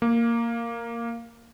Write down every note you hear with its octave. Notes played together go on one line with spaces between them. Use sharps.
A#3